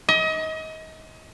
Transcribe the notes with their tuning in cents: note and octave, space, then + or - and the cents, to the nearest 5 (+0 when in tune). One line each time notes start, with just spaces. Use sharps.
D#5 +30